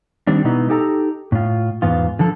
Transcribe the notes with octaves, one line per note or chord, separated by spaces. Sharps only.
D#3 G3 C4 D4
B2 G#3 B3 D#4 E4
D#4 G4 A4 G#5 A#5
A2 F4
E2 G#2 B3 F4
D3 F3 A4